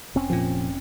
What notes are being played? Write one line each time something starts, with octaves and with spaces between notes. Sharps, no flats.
F1 C4 C#4
A#2 F3